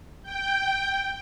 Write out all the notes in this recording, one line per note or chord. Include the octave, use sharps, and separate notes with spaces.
G5